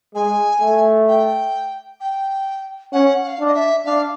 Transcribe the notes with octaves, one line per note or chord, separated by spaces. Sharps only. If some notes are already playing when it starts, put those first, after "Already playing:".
G#3 G#5
A3
G5
G5
C#4 F#5
F#5
F5
D4
D#5
E5
D4 F5